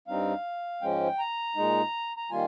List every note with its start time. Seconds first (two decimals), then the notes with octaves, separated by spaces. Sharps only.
0.07 G2 G3 C4 D#4 F5
0.82 G#2 F3 G#3 C#4 G5
1.19 A#5
1.56 A#2 G#3 D#4
2.17 A#5
2.30 D#3 G3 A#3 F4 G#5